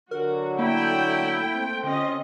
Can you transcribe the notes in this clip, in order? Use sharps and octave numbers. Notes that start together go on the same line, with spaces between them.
D3 F#3 F#4 A#4
A3 A#3 E4 G5
C4
D3 C#4 F4 D#5